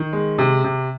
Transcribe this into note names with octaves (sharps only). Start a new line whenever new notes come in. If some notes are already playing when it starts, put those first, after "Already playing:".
Already playing: D#3
G#3
C3
C3